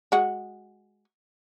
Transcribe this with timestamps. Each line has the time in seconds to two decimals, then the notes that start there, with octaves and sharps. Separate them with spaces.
0.12 G#3 F#4